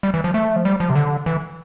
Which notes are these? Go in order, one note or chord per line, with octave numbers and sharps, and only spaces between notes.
G3
E3
F3
A3
F3
G3
F3
C3
D3
E3